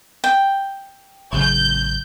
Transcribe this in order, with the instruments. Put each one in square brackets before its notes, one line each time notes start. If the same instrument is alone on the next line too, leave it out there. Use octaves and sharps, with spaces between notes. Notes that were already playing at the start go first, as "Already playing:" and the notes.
[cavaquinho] G5
[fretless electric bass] A1 C#3 F#3 [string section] G6